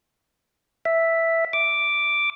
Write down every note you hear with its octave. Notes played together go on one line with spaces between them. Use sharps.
E5
D6